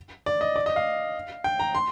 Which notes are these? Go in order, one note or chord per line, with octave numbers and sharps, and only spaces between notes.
D5
D#5
D5
D#5
F5
G5
A#5
C6